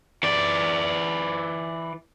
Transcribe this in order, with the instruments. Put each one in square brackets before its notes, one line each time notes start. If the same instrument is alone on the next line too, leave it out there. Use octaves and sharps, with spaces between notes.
[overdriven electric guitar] E3 D5